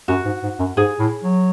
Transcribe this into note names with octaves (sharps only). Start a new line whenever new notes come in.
F#2 F#4
G#2
G#2
F#2
G#2 G#4
A2
F#3